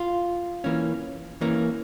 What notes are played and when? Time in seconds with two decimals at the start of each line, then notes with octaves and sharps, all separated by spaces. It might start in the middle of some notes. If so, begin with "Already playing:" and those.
Already playing: F4
0.64 E3 A#3 C#4
1.41 E3 A#3 C#4